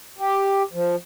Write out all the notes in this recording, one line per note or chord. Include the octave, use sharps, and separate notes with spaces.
G4
F3